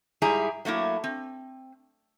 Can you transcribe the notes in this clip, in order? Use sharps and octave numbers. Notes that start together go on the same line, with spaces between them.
G#2 G3 E4 G#4 A#5
F#3 A3 A#3 E4
C4